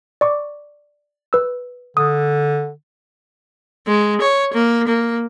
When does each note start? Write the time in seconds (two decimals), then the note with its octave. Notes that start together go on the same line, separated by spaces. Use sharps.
0.21 D5 C#6 D6
1.33 B4 E6
1.97 D3 D#6
3.87 G#3
4.21 C#5
4.54 A#3
4.88 A#3